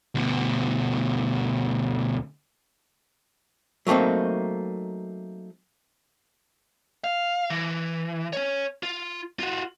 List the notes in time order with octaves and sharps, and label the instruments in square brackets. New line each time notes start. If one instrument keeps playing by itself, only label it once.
[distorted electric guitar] D2 B2
[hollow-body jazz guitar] F#3 A3 A#3 C4 D#4
[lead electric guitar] F5
E3
C#4 C#5
F4
F4 F#4